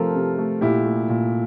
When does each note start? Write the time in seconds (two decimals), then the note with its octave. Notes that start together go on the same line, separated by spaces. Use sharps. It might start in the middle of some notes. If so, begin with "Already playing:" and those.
Already playing: C3 F3 A3 C4 F4 A4 A#4
0.14 C3
0.38 A3
0.61 A#2 E4 G4
0.84 A3
1.09 A#2